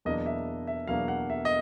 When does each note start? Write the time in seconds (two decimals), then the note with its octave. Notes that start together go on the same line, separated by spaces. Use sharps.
0.05 E2 B2 F#3 A#3 D4 D#5
0.26 E5
0.67 E5
0.87 E2 B2 F#3 A#3 D4 F5
1.08 F#5
1.30 E5
1.45 D#5